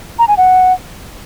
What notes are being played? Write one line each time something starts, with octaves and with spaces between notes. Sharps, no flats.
A#5
G#5
F#5